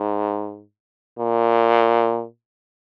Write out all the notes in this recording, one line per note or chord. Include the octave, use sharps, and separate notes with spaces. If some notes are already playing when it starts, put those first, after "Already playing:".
Already playing: G#2
A#2